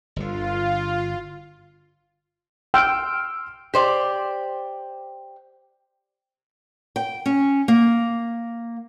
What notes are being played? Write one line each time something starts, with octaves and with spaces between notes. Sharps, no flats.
G1 D3 F4
G5 C6 E6 F6
G4 C5 D5
G5
C#4
A#3